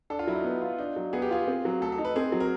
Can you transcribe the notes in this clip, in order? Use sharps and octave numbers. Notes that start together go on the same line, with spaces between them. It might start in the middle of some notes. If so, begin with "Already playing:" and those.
D4 A4
F4
F#3 E4
D#4
B3
F4
D4 D#4
F#3
B3 G#4
G4
F4 G#4
C4
F#3
A3 A4
A4
D#4
B4
C4 G#4
F#3
A#4